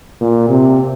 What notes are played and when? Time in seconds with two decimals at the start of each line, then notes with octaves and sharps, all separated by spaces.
0.21 A#2
0.49 C3